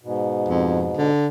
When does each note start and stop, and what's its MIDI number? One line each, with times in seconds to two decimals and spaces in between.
0.01 1.10 44
0.01 1.10 47
0.48 0.91 41
0.97 1.28 50